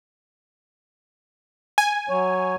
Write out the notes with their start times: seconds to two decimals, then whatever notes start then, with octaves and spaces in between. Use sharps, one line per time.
1.78 G#5
2.09 F#3 C#5